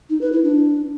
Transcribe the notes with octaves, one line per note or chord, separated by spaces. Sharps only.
D#4
B4
E4
D4